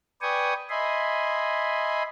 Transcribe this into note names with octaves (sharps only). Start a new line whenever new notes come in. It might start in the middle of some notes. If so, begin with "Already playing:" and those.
B4 D5 G5 G#5 C#6 D#6
D#5 E5 G#5 B5 C6